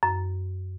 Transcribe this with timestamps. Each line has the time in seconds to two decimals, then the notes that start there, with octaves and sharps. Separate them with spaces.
0.03 F#2